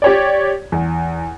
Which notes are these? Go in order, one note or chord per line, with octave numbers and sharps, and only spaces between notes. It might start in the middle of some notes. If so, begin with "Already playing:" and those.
G4 C#5 D5
E2